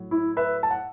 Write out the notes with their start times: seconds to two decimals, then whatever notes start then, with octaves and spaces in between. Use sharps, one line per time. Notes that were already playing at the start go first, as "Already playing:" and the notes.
Already playing: A2 F#3
0.11 E4
0.37 B4 E5
0.63 A5
0.71 F#5